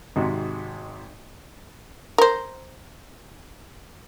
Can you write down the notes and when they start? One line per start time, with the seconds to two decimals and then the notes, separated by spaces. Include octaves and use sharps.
0.16 G#1 G#2 C3 F#4
2.18 A#4 C5